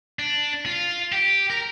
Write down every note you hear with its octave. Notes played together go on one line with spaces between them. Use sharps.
D4
F4
G4
A#4